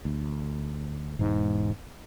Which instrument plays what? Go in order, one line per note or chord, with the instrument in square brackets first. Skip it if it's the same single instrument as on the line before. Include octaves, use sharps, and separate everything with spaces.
[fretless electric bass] D2
[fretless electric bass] E1 [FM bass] G#2